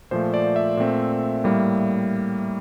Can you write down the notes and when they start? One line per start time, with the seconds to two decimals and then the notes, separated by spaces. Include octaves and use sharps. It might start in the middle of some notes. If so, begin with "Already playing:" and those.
0.11 A#2 F3 A3 C5
0.34 D5
0.56 E5
0.77 A#2 A3 C4
1.44 A2 G3 A#3